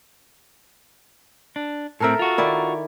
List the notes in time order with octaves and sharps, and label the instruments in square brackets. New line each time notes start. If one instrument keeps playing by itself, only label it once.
[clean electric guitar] D4
[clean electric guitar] A2 C4 [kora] A4 A#4 E5
[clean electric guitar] F4 F#4
[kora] D#3 E4 D5